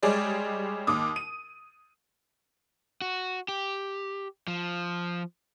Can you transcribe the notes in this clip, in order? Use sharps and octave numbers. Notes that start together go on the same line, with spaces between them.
G3 G#3 G#4 C#5 D5
D#2 D6 D#6
D#7
F#4
G4
F3